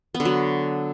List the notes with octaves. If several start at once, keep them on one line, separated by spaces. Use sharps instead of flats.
B3
D3
F#3